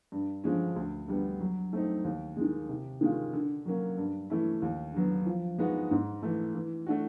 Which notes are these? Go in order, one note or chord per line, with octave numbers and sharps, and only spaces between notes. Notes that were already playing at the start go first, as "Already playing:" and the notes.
G2
D3 F3 G#3 C#4
D2
D3 G3 B3
F#3
A3 C4 D#4
D#2
D#3 G#3
C3
D#3 G#3 C#4 F4
D3
F#3 A#3 C#4
G2
E3 A3 C#4 E4
D#2
D3 F#3 B3
F3
G#3 B3 D#4 F#4
G#2
E3 A3
E3
A3 D4 F#4